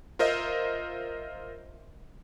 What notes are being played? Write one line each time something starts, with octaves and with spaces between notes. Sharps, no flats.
F4 A#4 C5 D#5 E5